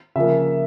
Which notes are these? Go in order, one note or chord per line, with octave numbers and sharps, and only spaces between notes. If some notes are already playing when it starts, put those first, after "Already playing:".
C#3 F3 A#3 E5